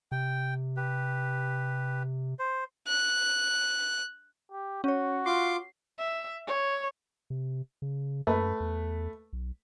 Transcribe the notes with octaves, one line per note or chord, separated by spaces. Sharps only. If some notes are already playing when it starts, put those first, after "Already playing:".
C3 G5
G4 B4
C5
F#6
G4
C#4 F#4 C#5
F4 C6 D6 C7
E5
C#5
C3
C#3
F#2 A3 B4
E2
B1